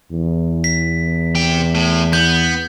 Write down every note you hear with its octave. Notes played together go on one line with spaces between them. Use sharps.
E2
B6
C3 G5
A2
B3 G6